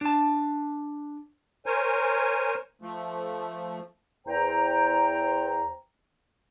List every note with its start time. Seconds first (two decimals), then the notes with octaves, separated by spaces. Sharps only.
0.01 D4 A5
1.66 A#4 C5 C#5 G#5
2.82 F3 A3
4.27 E2 C5 G5 A#5